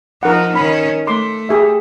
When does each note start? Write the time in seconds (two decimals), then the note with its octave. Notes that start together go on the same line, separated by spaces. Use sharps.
0.23 F3 D#4 A#4 F#5
0.55 D#3 C#4 B5
1.07 A3 C6 D6
1.49 G4 G#4 E5